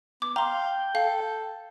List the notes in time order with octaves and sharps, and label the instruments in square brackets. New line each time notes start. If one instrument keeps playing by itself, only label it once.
[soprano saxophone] B3 [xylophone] D6
[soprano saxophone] F5 [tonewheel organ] G5 [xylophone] A#5 C6
[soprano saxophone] A4 [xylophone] F5